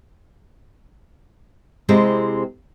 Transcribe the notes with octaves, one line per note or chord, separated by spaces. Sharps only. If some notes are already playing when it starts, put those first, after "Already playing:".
C3 G#3 C4 E4 G4 G5